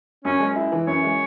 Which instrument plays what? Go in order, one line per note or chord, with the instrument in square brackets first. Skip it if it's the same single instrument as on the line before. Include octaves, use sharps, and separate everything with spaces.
[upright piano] F#2 [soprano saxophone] C#4
[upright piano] G#3
E4
E3
[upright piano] F#2 [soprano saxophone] C#5
[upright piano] G#3